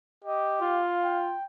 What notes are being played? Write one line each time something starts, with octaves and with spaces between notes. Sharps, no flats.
G4 D#5
F4 F5
G5